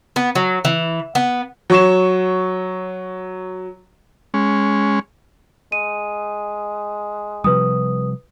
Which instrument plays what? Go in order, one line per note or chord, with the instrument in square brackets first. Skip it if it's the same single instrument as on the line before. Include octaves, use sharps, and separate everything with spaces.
[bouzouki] B3
F#3
E3
B3
[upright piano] F#3 C#6 E7
[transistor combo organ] G#3 C#4
[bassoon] G#3 [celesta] D#7
[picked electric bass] C3 F3 G3 [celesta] B4 D#6